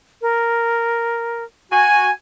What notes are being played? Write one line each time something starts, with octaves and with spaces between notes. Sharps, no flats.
A#4
F#4 G#5